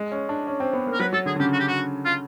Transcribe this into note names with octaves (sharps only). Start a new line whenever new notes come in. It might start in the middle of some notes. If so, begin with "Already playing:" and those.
Already playing: G#3
C#4
D4
C#4
C4
B3
A#3
A#4
F#3 B4
F#3 A4
D3 G#4
D3
C#3 G4
F#4
G4
F#4
F4